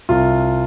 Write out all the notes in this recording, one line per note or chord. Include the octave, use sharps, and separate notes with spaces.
C2 F4